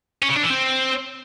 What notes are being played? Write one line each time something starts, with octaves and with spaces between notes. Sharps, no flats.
C#4
C#3
D4
E3
C4